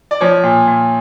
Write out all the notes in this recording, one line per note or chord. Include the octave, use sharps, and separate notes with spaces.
D5
F3 C#5
A#2
A#2